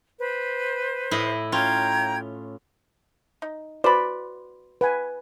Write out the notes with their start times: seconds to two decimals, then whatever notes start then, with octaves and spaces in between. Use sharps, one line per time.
0.19 B4 C5
1.11 A2 E4 D#5
1.52 C#4 F4 G5 A#5 G#6
3.42 D#4
3.84 F#4 B4 C5 D5 B5
4.81 B4 F#5 G#5